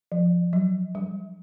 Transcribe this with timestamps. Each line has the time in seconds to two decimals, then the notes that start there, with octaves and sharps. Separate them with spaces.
0.12 F3
0.53 F#3
0.95 G3